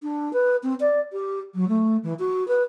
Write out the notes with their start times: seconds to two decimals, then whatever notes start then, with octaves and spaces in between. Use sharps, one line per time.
0.02 D4
0.33 B4
0.63 C4
0.80 D5
1.12 G4
1.54 F#3
1.68 A3
2.03 E3
2.19 F#4
2.47 B4